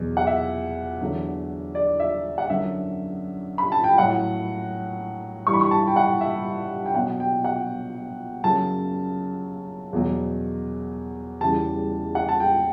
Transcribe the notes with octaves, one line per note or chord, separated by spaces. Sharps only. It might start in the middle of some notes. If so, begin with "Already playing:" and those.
Already playing: E2 B2 F#3
F#5
E5
E2 D3 F#3
D5
E5
F#5
F#2 D3 F#3 E5
B5
A5
G5
A2 F#3 F#5
G2 E3 G3 C#6
B5
C#6
A5
G5
F#5
E5
G5
B2 F#3 F#5
G5
F#5
F#2 C#3 F#3 A5
E2 B2 F#3
E2 C#3 E3 G3 A5
F#5
A5
G5